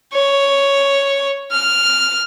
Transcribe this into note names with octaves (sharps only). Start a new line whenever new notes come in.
C#5
F6